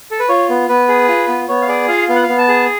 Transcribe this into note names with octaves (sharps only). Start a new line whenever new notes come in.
A4
B4
F4 C#5
B3
B3 B4
G#4
F4
B3
B3 C#5
F5
G#4 D5
F4 F5
B3 F5
F#5
F5
B3
A5
G#4